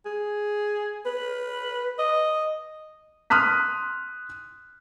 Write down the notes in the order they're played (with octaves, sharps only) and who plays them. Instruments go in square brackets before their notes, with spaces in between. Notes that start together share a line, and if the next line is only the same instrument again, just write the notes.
[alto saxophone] G#4
B4
D#5
[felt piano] C6 D#6 F6 F#6 B6